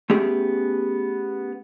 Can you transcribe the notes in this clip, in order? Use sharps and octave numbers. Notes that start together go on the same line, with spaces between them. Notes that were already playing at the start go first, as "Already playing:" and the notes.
A3 B3 C#4 G4 G#4